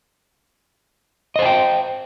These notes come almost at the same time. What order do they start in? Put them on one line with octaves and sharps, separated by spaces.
D#5 C5 G#5 G5